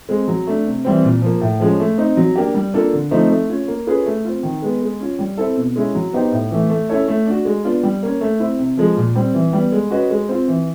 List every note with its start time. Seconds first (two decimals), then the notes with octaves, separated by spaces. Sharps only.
0.09 G#3 C4
0.28 F#3
0.47 A3 D4
0.66 C3
0.85 E3 G3 C4
1.04 A#2
1.22 F3 A#3
1.41 A2
1.60 F3 G#3 C#4
1.79 A3
1.98 C4 D#4
2.17 F#3
2.36 A#3 D4 G4
2.54 G3
2.74 A#3 D4 F4 A4
2.93 D3
3.11 F3 A3 C4 D#4
3.30 A3
3.49 C#4 F4
3.68 A#3
3.86 C#4 F4 G#4 B4
4.06 A3
4.25 C4 F4
4.43 D#3
4.62 G#3 B3
4.81 G#3
5.00 C#4 F4
5.19 G3
5.37 C4 E4 A4
5.57 B2
5.76 G#3 C#4 E4
5.95 F#3
6.13 B3 D#4 G4 C5
6.32 A2
6.51 E3 A3
6.70 A3
6.89 C#4 E4 A4 C#5
7.08 A3
7.27 D4 F#4
7.45 G#3
7.64 B3 D4 F4
7.83 G3
8.03 A#3 C#4
8.21 A3
8.40 C4 E4
8.58 C3
8.77 F3 G#3
8.97 A#2
9.15 G3 C4
9.34 E3
9.53 G3 B3
9.72 G#3
9.91 C#4 F#4 B4 D#5
10.10 G#3
10.29 C4 F4
10.48 E3